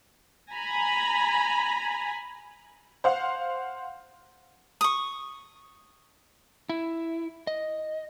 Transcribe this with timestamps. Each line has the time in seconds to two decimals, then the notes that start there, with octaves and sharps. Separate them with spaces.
0.50 G#5 A#5 B5
3.04 C5 F5 F#5
4.81 C#6 D#6
6.69 E4
7.47 D#5